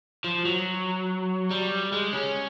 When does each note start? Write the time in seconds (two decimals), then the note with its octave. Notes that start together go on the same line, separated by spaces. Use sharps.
0.24 F3
0.45 F#3
1.51 G3
1.92 G#3
2.13 C#4